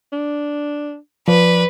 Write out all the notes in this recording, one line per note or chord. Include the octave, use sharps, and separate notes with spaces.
D4
F3 B4 D5